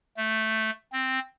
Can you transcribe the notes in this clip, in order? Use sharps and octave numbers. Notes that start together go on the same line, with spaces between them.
A3
C4